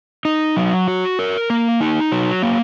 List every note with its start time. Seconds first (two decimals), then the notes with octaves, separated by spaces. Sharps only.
0.25 D#4
0.56 F#3
0.88 F#4
1.19 A#4
1.50 A#3
1.81 D#4
2.12 F#3
2.43 A#3